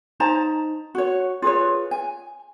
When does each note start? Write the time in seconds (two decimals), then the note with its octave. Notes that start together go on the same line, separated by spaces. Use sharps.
0.20 D#4 C5 A5 A#5
0.95 F#4 C#5
1.42 F4 G#4 B4 C#5
1.91 G#5